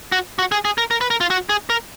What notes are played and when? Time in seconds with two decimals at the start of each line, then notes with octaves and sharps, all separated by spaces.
0.12 F#4
0.39 F#4
0.52 G#4
0.65 G#4
0.78 A#4
0.91 A#4
1.01 B4
1.10 A#4
1.21 F4
1.30 F#4
1.49 G#4
1.70 A#4